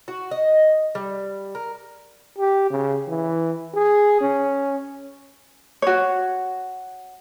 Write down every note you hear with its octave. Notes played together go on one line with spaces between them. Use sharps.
F#4
D#5
G3
A#4
G4
C#3
E3
G#4
C#4
F#4 C#5